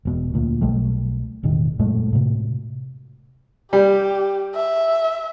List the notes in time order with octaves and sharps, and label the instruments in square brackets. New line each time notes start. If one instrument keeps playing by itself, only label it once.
[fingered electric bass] E1 B2
D2 A#2
B1 G3 A3
E1 A2 D#3
F#2 A#2 G#3 A3
A2 C3
[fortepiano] G3 [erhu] G4
[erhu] E5